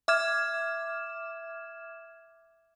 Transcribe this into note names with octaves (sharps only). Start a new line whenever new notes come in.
E5 D6 F6 G#6 E7